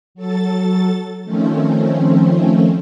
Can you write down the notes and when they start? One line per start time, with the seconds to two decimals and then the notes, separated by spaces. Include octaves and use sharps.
0.15 F#3 A4 A6
1.24 D#3 F3 A3 C4 C#4